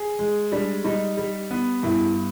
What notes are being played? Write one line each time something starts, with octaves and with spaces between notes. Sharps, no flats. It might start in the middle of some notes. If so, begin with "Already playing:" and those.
Already playing: G#4
G#3
G3 D4
G3 D#4
G3
B3
G2 E4